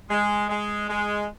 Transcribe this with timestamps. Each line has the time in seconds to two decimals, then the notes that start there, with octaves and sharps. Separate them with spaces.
0.10 G#3
0.50 G#3
0.89 G#3